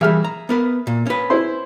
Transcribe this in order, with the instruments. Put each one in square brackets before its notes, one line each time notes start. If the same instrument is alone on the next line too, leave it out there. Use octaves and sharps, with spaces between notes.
[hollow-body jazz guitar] E3 G3 [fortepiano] G#4 E5 F6
[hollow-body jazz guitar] A#5
B3 A#4 B4
A#2
C#4 B4
[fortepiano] E4 C5 C6